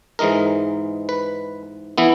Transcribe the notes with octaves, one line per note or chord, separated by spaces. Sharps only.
G#2 E3 G#3 D#4 A#4
B4
E3 B3 E4